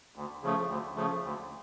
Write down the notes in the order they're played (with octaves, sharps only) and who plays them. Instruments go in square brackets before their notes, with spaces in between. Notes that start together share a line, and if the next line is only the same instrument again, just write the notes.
[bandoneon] D2
C#3 F3 A3
D2
C#3 F3 A3
D2